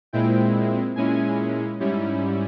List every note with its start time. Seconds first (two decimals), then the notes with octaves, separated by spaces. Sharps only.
0.13 A#2 G#3 C4 E4 G5
0.96 A#2 G#3 C#4 E4 G#5
1.80 G#2 G3 C#4 E4